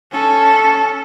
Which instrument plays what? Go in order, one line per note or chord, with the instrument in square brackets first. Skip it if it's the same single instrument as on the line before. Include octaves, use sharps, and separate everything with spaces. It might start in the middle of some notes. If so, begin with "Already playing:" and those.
[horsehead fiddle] C#4 A4